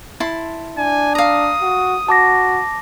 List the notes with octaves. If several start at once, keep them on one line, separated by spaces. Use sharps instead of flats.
E4 A5 C6
D4 G#5
F5 A#5 D#6
F#4
F#4 A5 D6 A#6